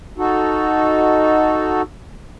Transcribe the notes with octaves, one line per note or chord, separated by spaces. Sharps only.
D#4 F#4 A4